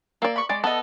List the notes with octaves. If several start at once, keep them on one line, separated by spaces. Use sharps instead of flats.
A#3 D5 E6
B5 C#6
G#3 D5
B3 A4 D#5